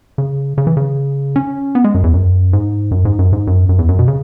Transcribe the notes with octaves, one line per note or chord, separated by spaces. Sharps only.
C#3
C#3
E3
C#3
C#4
B3
G#3
F#2
E2
F#2
G#2
F#2
G#2
F#2
G#2
F#2
F#2
E2
F#2
B2
C#3